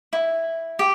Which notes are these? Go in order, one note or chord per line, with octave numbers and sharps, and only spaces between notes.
E4
G4